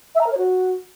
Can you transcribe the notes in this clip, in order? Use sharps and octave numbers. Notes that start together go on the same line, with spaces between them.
E5
A#5
A#4
C#5
F#4